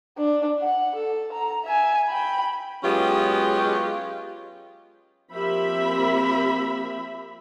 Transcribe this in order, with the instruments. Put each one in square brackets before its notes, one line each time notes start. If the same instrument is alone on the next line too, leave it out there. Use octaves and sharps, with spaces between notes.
[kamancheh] D4
F#5
A4
A#5
E5 G#5
G5 B5
[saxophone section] F#3 G#3 B3 C#4 F4 G4
[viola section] F3 A#3 C4 G4 E5 B5